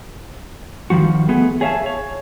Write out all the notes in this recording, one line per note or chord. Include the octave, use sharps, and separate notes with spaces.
D#3 F3 G3 F#4
A3 B3 G#4
G#4 C#5 E5 F5 A5
C#5